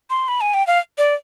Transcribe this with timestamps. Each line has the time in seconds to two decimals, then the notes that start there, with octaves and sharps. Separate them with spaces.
0.10 C6
0.28 B5
0.41 G#5
0.54 G5
0.67 F5
0.98 D5